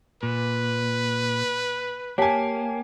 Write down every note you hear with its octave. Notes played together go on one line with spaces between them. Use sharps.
A#2 B4
A#3 G4 C#5 G#5 A5 B6